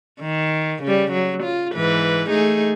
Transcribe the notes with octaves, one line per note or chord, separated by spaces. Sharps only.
D#3
C#3 G3
F#3
F4
G#2 E3 B4
A3 D#4 G#4